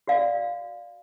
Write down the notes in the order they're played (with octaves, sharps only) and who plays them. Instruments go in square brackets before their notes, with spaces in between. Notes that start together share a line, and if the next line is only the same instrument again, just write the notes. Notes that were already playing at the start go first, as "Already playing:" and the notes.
[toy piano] F#4 D5 F5